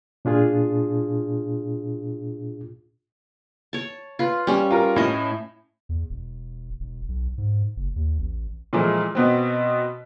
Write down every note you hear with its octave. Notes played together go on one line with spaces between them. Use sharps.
A#2 D4 F4 G#4
C#5 A5
F4 B4
G3 C#4
F4 A#4
A2 C#4 D#5
E2
E1
E1
B1
G#2
F#1
D#2
A1
A#2 E3 F3 G#3 A3
B2 B3 C4